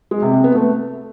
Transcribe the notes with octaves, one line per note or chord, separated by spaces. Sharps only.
G#3
C3
C4
B3
A3